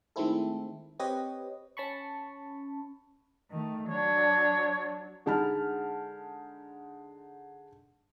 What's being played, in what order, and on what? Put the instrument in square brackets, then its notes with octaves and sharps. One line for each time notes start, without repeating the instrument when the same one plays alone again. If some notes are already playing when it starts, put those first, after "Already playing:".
[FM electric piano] D#3 G#3 A3 C4 E4 A4
C4 G4 B4 C#5 D#5
C#4 A5 B5 C#6
[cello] D#3 A3
[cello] F#3 D4 [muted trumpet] C#5
[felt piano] D3 G#3 D#4 A5 B5 F6